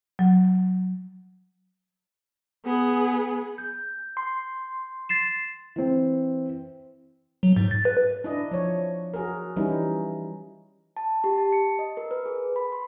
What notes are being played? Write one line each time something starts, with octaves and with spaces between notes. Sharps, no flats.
F#3
B3 G#4
G6
C6
A6 C7 E7
E3 C4
F#3
G#2
A6
B4
D4 E4 D#5
F3 C#5
F#4 G#4 A#4
E3 G3 C#4 D#4 E4
A5
G4
A5
C#7
D#5
A#4
B4
G#4
B5
C6